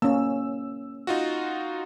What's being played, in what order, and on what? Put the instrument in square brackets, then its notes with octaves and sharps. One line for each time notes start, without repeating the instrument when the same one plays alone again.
[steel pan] A#3 C#4 [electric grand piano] E6
[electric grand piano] D#4 F4 F#4